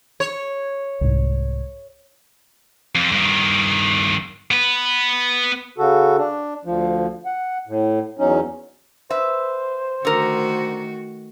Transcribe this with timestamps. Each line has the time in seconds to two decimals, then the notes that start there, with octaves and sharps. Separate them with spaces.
0.20 C#5
1.01 C2 G#2
2.95 F2
3.12 G2 D#3
4.51 B3 B4
5.78 C#3 F#4 A4
6.18 D4
6.65 D2 F3
7.26 F#5
7.67 A2
8.19 E2 F#3 C#4 D#4
9.10 B4 C5 E5
10.05 D3 D#3 A3 F#4 A#4